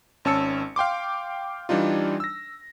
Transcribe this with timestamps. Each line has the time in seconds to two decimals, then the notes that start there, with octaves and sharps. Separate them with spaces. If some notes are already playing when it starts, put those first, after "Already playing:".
0.25 G#1 C#4 A5 E6 C#7
0.76 F5 G5 C6 D6
1.69 E3 G3 D4 D#4 F4
2.20 E6 A#6